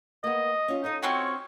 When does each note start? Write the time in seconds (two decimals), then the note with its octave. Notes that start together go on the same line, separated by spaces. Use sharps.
0.24 A#3 B3 D#5
0.68 C#4 F4
0.84 D#4 F4 A4 D#5
1.03 C4 C#4 F#4 C#5